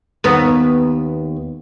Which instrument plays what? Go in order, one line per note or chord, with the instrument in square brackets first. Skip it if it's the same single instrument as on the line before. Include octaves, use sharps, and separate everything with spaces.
[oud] D#2 B3